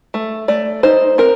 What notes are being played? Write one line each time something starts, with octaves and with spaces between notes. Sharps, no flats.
A3
A3 D5
D#4 C5
C4 A#4